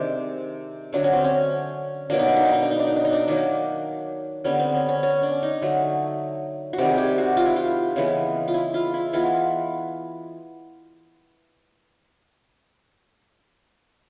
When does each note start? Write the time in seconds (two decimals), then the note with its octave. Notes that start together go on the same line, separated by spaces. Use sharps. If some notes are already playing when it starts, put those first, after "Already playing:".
Already playing: C3 D#3 G#3 D4
0.93 D3 F#3 A3 D4
1.04 C#4
1.13 C4
1.24 C#4
2.10 B2 F#3 A#3 D4
2.19 D#4
2.28 D4
2.36 D#4
2.45 D4
2.53 D#4
2.62 D4
2.71 D#4
2.79 D4
2.87 D#4
2.96 D4
3.05 D#4
3.13 D4
3.28 D#3 F#3 A#3 D4
4.44 D3 G3 B3 C#4
4.59 C4
4.74 C#4
4.89 C#4
5.03 C#4
5.23 D4
5.43 D#4
5.62 D3 F#3 A3
6.73 F#4
6.78 C3 D#3 G3 G4
6.89 G#4
6.98 G4
7.18 F#4
7.37 F4
7.46 E4
7.56 F4
7.96 C#3 E3 G#3 B3
8.48 F4
8.54 E4
8.74 F4
8.94 E4
9.13 E3 G#3 B3 F4